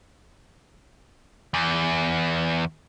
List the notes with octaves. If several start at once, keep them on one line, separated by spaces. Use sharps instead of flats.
E2